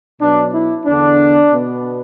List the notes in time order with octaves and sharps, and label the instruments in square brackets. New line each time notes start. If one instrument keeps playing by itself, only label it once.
[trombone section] B2 F#3 B3 D4
E4
E2 D3 B3 D4
B2 B3